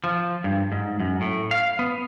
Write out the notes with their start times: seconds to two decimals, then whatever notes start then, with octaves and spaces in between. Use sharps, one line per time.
0.04 F3
0.44 G2
0.72 G#2
1.00 F#2
1.21 A2
1.51 F5
1.79 B3